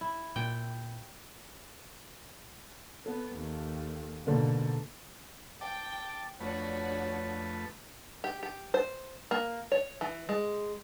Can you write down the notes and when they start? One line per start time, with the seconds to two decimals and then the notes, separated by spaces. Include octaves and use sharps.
0.01 E4
0.36 A#2 G5
3.06 B3 A4
3.36 D#2
4.26 G#2 B2 D3 A#3 A4
5.61 G5 A5 D6
6.41 F2 A3 D4 F#4 B4 C#5
8.24 G4
8.43 G4
8.74 C5
9.31 A#3
9.72 C#5
10.01 E3
10.29 G#3